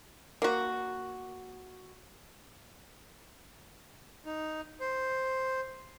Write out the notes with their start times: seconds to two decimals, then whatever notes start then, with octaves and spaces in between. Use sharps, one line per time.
0.42 A#3 F#4
4.26 D#4
4.80 C5